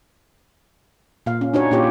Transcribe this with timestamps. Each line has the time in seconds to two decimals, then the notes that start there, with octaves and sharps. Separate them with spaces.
1.26 A#2 F5
1.41 C#4
1.54 D4 D#4 F#4 C#5
1.71 A#2 C#4 F4 G4 C#5